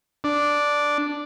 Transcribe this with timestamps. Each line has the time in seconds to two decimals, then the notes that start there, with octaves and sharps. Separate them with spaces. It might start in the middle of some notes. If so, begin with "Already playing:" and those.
0.24 D4